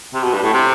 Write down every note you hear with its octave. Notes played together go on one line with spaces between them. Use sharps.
C3
B2
G2
A2
C3